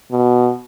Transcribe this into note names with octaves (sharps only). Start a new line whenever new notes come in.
B2